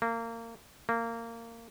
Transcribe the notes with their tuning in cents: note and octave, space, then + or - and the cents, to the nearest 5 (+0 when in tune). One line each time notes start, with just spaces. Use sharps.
A#3 -25
A#3 -20